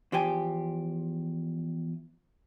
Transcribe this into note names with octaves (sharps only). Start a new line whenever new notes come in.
E2 F3 G4 G#5